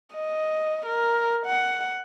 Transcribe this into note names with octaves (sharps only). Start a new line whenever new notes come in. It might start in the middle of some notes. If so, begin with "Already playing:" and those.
D#5
A#4
F#5